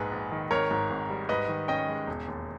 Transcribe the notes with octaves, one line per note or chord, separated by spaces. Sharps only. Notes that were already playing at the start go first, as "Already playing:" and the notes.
Already playing: A#1 G#2 G#4 B4
A#1
D#3
G#1 A#4 C#5
G#2
G#1
G3
G#2 B4 D#5
D#3
C#4 D#5 G5
G#3
E1
D#2